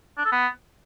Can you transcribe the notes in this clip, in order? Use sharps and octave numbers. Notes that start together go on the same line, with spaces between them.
D4
A4
B3